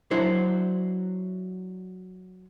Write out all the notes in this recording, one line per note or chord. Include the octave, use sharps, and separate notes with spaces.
F#3 D4 E4 C5